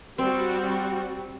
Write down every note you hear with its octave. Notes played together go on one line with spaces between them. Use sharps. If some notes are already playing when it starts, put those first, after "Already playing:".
G3 C4 F#4